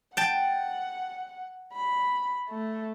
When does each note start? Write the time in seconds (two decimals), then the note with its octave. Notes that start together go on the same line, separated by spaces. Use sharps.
0.17 F#5 G5 A5
1.73 B5
2.50 A3